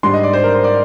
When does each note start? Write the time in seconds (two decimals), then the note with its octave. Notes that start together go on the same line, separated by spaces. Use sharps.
0.03 G#2 G3 D4 C6
0.13 D#5
0.23 D5
0.33 C5
0.44 A#4
0.54 C5
0.64 D5